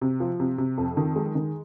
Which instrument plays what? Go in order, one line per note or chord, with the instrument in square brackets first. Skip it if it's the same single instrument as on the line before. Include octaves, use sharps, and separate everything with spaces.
[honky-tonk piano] C3
F3
C3
C3
F2
D#3
G#3
D#3